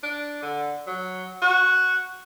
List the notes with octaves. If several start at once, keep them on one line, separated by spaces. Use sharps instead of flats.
D4
D3
F#3
F#4